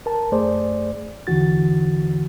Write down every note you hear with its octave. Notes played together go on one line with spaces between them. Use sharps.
A#4 A5
F#2 A3 G#4 C5 D5
E2 D3 E3 F#4 A6